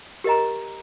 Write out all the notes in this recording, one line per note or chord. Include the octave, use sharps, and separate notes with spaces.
G4 A#4 D#5 A#5